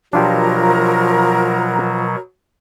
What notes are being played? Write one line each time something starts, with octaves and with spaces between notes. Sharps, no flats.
B2 F3 F#3 D4 F4 G4 A#4 A#5